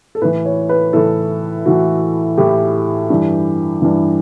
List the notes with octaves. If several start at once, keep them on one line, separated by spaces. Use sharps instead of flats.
A4
A2 E3 B4
C#5
B4
A2 E3 A4
A2 E3 F#4
A2 E3 G4
G2 E3
G2 E3